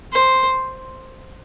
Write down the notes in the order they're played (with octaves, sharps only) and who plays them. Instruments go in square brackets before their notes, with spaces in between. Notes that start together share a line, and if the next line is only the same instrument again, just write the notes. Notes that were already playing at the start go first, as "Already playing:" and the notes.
[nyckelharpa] C5